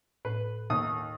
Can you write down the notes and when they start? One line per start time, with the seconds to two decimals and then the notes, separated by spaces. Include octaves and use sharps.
0.25 A2 B4
0.70 D#2 D#6